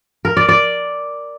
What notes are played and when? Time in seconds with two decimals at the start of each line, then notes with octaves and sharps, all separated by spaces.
0.25 A#4
0.37 D5
0.49 D5